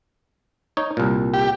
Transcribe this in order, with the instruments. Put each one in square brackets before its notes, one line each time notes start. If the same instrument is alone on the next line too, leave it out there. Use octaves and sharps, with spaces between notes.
[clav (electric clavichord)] D#4 C#5
C2 A#2
[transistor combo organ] G4